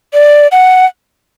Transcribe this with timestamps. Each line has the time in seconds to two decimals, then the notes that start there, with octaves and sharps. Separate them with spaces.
0.14 D5
0.52 F#5